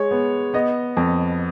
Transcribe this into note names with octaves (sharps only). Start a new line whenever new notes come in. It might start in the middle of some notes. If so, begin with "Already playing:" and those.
Already playing: G#3 C#5
B3
B3 D#5
F2